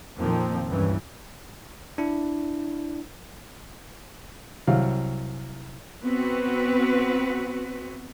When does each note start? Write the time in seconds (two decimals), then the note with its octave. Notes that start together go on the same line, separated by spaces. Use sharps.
0.17 F2 A#2 D#3 F3 A#3 C4
0.67 C#2 G2 C#3 E3
1.98 D4 E4
4.67 C2 F#3 F5
6.03 B3 C4 F#4 B4